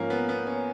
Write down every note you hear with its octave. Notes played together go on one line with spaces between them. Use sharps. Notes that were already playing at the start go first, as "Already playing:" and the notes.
Already playing: G#2 F3 A#3 C#4
B3
B3
C#4